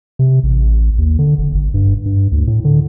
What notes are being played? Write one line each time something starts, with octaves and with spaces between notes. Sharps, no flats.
C3
A1
D#2
D3
F#1
G1
G2
G2
D2
A2
D3